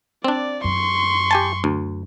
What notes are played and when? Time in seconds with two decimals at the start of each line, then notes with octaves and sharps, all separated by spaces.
0.24 C4 D4 D5
0.64 F#2 C6 C#6
1.31 G4 G#5 A5
1.64 D2